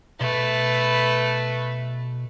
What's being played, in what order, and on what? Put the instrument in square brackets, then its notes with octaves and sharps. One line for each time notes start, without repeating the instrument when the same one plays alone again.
[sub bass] B2 [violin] A3 B4